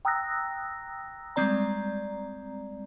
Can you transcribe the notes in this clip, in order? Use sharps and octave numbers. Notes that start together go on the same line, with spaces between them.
G5 A#5 D#6 E6 F#6 A#6
G3 G#3 C4 D5 A#5